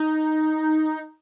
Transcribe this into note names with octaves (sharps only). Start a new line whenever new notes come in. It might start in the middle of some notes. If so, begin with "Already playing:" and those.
Already playing: D#4